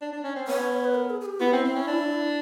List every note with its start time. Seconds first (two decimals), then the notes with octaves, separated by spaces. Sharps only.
0.01 D4
0.13 D4
0.24 C#4
0.36 C4
0.48 B3 C#5
0.84 B4
0.95 A#4
1.10 G#4
1.21 G#4
1.26 G4
1.41 B3 E4
1.53 C4
1.65 C4
1.76 C#4
1.87 D4